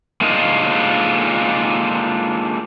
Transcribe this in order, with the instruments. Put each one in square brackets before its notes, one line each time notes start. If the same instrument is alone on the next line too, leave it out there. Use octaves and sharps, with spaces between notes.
[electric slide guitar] G#3 A#3 D4 D#4 F4 D#5